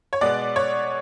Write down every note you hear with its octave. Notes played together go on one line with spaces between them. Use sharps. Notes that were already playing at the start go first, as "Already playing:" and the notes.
C#5
B2 G#3 B3 D5
C#5